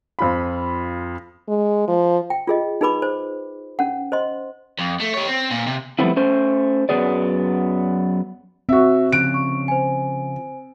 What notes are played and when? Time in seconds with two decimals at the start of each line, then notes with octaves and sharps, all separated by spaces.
0.19 F2 F4 B5
1.48 G#3
1.88 F3
2.30 G5
2.47 F4 G#4 D#5
2.81 D#4 G#4 B4 B5 D6
3.02 C5
3.79 C#4 F#5
4.12 C5 D#5 C6
4.79 F2
5.00 A3
5.14 G4 C#5
5.28 C4
5.51 A#2
5.67 C3
5.99 F3 G3 A3 B3 C4 E4
6.16 A3 C#4 C5
6.89 F#2 F3 F#3 B3 G#4 D5
8.69 C4 F#4 E5
9.12 C#3 F3 F#6 D7
9.34 C#6
9.68 C5 G#5